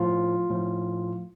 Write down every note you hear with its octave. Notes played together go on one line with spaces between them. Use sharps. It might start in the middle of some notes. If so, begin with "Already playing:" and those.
Already playing: A2 F3 F4
A2 F3